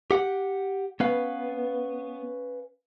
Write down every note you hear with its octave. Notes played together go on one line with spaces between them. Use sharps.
G4 F#5
B3 C#4 B4 F5